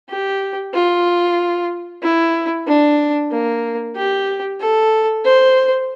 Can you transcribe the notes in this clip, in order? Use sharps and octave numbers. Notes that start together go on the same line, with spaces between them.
G4
F4
E4
D4
A#3
G4
A4
C5